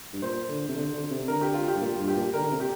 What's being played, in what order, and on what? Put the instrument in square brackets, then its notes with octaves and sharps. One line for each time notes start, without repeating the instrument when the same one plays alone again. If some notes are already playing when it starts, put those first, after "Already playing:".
[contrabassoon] G2
[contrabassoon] A#2 [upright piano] C5
[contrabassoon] D3
C3
D3
D3
C3
[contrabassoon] D3 [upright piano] A#4
[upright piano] G4
F4
G4
[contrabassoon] G2
[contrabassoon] A#2 [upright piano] F4
[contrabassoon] G2
[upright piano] G4
[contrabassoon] A#2
[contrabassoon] D3 [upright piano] A#4
[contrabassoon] D3
C3
[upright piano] G4